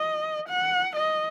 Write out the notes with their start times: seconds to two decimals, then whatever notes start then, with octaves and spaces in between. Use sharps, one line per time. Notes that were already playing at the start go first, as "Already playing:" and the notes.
Already playing: D#5
0.49 F#5
0.96 D#5